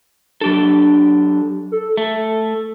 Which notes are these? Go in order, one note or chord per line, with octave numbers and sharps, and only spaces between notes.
F#3 D4 G4 A4
A4
A3 A4